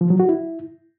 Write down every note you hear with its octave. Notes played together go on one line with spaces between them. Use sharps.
F3
F#3
F#4
E4